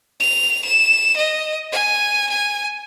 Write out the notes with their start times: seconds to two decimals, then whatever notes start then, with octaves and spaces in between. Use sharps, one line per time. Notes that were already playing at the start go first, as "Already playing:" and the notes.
0.20 F7
0.65 E7
1.17 D#5
1.72 G#5
2.30 G#5